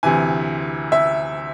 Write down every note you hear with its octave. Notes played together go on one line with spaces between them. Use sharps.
D2 C3 E3 G#5
E5